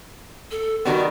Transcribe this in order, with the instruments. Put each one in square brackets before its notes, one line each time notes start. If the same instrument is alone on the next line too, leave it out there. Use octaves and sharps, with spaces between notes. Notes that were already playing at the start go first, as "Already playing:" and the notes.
[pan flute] A4
[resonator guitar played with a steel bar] D#3 G3 B3 [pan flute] F#4